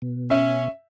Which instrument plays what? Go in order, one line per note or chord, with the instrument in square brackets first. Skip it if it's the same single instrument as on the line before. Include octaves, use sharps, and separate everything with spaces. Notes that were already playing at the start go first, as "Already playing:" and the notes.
[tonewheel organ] B2
[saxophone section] C#4 [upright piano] E5